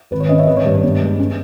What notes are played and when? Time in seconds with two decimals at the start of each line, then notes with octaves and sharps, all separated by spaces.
0.11 G#1 B4
0.20 C#5
0.29 C#4 B4 D#5
0.38 C#5 E5
0.47 G#1 B4 D#5
0.57 C#5
0.65 G2 B4
0.74 C#5
0.84 B3
1.01 G#3
1.19 C#4